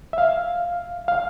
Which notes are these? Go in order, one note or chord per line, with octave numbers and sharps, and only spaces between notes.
E5
F5
F5